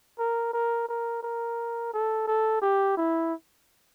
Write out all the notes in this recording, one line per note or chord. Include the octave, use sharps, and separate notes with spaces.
A#4
A#4
A#4
A#4
A4
A4
G4
E4